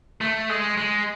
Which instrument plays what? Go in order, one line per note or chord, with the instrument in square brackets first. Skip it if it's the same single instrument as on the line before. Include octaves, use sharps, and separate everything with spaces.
[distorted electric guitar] A3
G#3
G#3